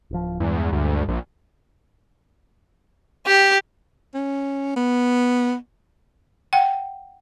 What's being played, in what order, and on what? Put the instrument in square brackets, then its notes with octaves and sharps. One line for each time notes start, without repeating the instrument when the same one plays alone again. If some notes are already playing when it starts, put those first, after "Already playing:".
[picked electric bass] D1 F3
[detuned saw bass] E2 [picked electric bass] G2 G#3
[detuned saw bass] D2
A#1
[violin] G4
[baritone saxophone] C#4
B3
[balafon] F#5 G5